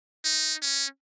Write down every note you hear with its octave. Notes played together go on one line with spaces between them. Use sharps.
D#4
C#4